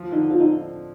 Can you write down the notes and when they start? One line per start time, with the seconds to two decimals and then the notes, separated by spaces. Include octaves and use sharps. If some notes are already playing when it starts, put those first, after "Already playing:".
Already playing: F3
0.12 D3 D#4
0.30 C4 F4
0.40 D#4